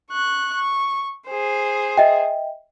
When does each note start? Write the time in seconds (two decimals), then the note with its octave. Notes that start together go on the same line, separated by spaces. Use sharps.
0.11 C#6 F#6
0.54 C#6
1.28 G#4 C5
1.97 D#5 E5 G5